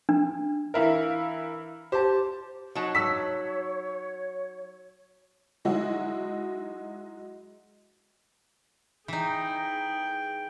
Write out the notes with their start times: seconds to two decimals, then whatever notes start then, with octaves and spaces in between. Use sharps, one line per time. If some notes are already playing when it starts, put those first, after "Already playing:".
0.09 D4
0.74 E3 E4 A#4 E5 F5
1.92 G4 C5 A5
2.75 F#3 D#4 A5
2.95 C#5 E6 B6
5.65 F#3 G#3 D#4 E4 F#4
9.08 E3 D#4 G#4 G5